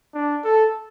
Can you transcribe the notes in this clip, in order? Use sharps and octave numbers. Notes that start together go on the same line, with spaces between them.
D4
A4